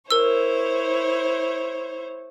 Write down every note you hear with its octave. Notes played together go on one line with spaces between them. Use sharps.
E4 A#4 C5 C#5 E6